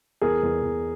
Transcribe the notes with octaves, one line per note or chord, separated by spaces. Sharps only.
E2 G#4 A#4
E2
E2